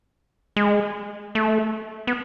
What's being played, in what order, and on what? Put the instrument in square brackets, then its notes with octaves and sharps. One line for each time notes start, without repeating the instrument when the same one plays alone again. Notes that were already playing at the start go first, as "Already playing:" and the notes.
[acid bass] G#3
A3
B3